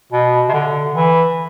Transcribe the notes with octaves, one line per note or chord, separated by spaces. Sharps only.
B2
C3
D3
E3